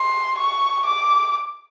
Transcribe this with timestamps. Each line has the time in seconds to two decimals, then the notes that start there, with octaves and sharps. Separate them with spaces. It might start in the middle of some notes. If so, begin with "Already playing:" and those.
Already playing: C6
0.38 C#6
0.85 D6